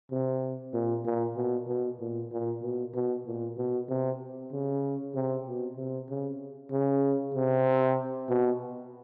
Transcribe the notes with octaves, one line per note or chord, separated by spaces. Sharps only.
C3
A#2
A#2
B2
B2
A#2
A#2
B2
B2
A#2
B2
C3
C#3
C3
B2
C3
C#3
C#3
C3
B2